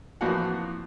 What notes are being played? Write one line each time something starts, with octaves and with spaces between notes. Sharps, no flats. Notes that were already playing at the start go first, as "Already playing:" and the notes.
F2 A2 E3 A#3 F#4 F#5